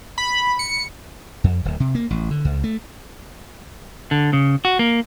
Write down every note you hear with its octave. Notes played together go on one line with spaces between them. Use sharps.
B5
C#7
F2
D1
C3
A#3
A1
D3
C#2
A3
D3
C#3
F#4
A#3